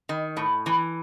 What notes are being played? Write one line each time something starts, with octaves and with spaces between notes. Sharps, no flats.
D#3
A2
E3